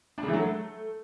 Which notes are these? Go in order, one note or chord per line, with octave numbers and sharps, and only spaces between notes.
D4
C#3
E3
F#3
A3